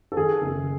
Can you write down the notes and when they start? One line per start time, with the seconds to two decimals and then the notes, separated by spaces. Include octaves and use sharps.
0.12 A4
0.17 D#3 G#4
0.42 F#1